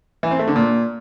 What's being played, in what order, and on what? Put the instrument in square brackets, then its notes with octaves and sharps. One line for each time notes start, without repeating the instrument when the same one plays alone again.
[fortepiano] E3
C4
A3
D3
A#2